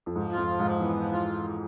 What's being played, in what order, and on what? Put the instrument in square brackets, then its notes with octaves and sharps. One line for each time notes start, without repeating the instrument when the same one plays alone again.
[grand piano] F2
[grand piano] G#2 [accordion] F3
[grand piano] F2 [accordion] F4
[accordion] F3
[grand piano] G#2
[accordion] F3
[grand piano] E3 [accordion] B3
[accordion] F3
F4
F3
F3